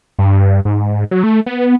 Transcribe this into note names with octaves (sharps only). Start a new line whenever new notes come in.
G2
G#2
F#3
A3
B3